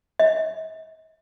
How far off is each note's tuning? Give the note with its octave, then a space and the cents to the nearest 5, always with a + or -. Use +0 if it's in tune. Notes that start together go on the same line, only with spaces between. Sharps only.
D#5 +40